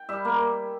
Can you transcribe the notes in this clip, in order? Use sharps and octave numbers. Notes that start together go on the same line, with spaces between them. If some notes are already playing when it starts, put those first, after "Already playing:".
Already playing: G5
G3 E5
A#3